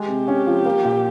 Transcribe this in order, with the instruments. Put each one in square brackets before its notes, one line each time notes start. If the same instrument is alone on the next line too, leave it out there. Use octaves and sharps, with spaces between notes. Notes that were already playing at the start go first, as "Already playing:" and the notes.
Already playing: [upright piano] G#3 [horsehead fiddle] G4
[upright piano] C3
C#4
F3
A#3
A#2